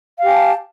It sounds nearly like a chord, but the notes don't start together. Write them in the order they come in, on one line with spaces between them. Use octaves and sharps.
F5 G4 G#5 A5